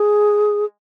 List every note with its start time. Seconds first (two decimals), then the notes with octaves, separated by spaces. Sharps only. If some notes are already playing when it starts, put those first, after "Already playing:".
Already playing: G#4